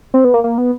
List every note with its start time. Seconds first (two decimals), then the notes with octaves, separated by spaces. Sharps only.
0.14 C4
0.25 B3
0.34 A#3
0.44 A#3
0.58 B3